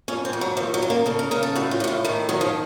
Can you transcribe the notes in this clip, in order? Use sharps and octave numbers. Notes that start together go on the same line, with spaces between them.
F2 C#4
C4
F2
F#3
D#2 F3
F#3
C#3
A#3
C#3 A4
A#4
C#3 A#4
A4
A2 F#4
F4
A2 F#4
F4
D#3 A3
D#3 F#3
F3